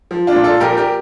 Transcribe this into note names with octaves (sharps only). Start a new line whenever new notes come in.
F3
D4 F4
A#2
F4 A4
A#1 G4 A#4
G4 A#4